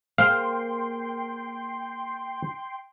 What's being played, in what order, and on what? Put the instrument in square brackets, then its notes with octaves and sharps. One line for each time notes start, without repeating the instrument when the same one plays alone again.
[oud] A#3 G#4 C5 [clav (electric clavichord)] F5 [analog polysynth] G5 C6